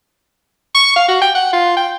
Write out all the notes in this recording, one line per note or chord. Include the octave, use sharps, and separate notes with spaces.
C#6
F5
F#4
G5
F#5
F4
G5